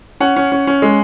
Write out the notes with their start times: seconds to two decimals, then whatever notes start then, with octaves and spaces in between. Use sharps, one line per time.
0.20 C#4 F#5
0.36 C#4
0.52 C#4
0.67 C#4
0.82 G#3